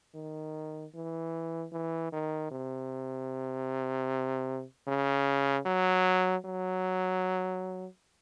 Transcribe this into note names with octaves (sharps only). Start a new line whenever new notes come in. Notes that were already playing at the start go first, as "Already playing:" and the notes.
D#3
E3
E3
D#3
C3
C#3
F#3
F#3